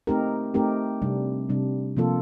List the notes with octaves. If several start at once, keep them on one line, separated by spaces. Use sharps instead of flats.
A3 C4 D#4 G4 A#4
A3 C4 D#4 G4 A#4
C3 G3 D4
C3 G3 D4
C3 F3 A#3 F4 A4